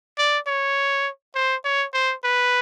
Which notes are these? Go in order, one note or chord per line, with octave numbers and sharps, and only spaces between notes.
D5
C#5
C5
C#5
C5
B4